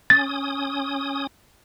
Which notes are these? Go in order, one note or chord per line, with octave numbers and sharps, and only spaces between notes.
C#4 D#6 A6